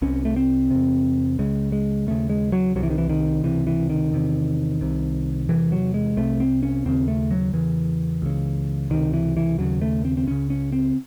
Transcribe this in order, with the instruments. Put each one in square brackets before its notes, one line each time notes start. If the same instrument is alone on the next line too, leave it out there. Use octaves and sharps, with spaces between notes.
[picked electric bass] C2 C3 C#4
A3
C4
E2 C3
C#2 C#3 G#3
G#3
D#2 C#3 A3
G#3
F#3
C2 C3 F#3
E3
D#3
E3
D#3
C#2 C3 E3
E3
D#3
E2 C3
C2 C3
E2 C3 E3
F#3
G#3
C2 C3 A3
C4
C#4
D#2 C#3 C4
A3
F#3
E2 C#3 E3
C#2 C#3
C#2 C3 D#3
E3
E3
D#2 C#3 F#3
A3
C4
C4
C#2 C#3 C#4
C#4
C4